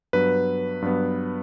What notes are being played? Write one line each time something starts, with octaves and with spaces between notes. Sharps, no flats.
G2 F#3 B3 B4
G2 F#3 B3